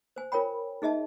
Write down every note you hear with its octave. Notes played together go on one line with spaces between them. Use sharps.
C5 G#5
F4 A#4 C#5 G5 B5
D#4 G#4 D#5 E5 A5